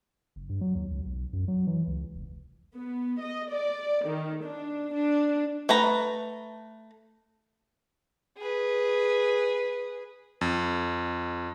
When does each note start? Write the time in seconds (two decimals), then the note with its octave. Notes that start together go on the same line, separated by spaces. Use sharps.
0.36 F#1
0.49 G2
0.61 F#3
0.75 D#2
0.91 C#2
1.06 B1
1.33 F#2
1.48 F#3
1.67 E3
1.87 C#2
2.15 F1
2.75 B3
3.20 D#5
3.50 D5
4.06 D#3
4.42 D4
4.93 D4
5.69 A3 B4 A#5
8.38 G#4 B4
10.41 F2